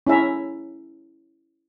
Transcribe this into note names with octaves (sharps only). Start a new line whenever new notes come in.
C#4 E4 E5 A#5